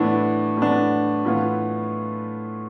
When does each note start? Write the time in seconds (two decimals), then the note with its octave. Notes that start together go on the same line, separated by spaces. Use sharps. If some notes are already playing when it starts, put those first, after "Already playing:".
Already playing: A2 E3 B3 D4
0.57 A2 E3 B3 D4
1.25 A2 E3 B3 F4